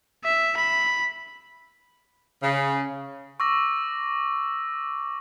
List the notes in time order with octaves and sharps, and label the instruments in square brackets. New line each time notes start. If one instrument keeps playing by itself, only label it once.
[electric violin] E5
B5
[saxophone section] C#3
[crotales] C#6 D6 E6 A#6